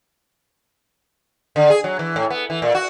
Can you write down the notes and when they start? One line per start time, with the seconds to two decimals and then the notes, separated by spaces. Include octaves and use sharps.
1.56 D3
1.70 G#4
1.84 F#3
1.99 E3
2.16 A2
2.30 B3
2.50 E3
2.62 A#2
2.75 F#4